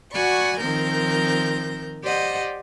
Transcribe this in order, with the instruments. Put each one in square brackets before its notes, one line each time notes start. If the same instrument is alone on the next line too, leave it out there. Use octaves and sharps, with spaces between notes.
[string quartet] F#4 D5 F#5 G#5 B5 C#6
D#3 F3 C4 A#4 G6 A#6
G4 C5 D5 D#5 F#5